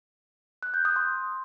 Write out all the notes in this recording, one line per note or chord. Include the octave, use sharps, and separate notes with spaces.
F#6
G6
D#6
C6